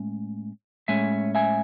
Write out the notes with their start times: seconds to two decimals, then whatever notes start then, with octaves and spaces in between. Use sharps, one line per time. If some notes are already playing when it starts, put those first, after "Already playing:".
Already playing: A2 G#3 C#4
0.88 A2 G#3 C#4 E5 G#5
1.35 E5 G#5